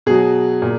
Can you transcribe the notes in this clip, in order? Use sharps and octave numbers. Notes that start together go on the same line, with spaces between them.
B2 F#3 G#4
A#2